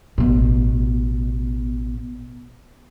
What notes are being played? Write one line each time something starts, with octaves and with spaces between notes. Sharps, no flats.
A1 B2